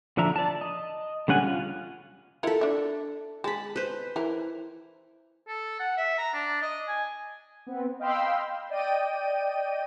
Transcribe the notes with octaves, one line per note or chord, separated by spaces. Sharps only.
D3 F3 D4 E5 A#5
D5 A5
D#5
D3 G3 C#4 F#5 G#5
F4
E4 F4 A4 A#4 F#5
D4 E5
G#3 A5 B5
B4 C5
E3 E4 A#4
A4
F#5
E5
A#5
D4
D#5
G#5
B3 C4
D#5 F5 G5 B5 C6 E6
D5 D#5 G5 D#7